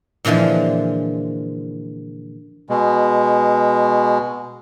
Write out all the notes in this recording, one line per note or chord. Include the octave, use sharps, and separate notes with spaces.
A#2 D3 E3 F3 G#3
B2 G#3